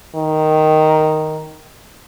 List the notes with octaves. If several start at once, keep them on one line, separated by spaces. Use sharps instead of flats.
D#3